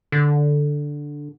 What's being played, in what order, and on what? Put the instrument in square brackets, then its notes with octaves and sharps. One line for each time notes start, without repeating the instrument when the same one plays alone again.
[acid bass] D3